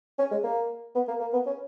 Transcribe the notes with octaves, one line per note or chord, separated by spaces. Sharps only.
C#4
G#3
A#3
B3
A#3
A#3
B3
C#4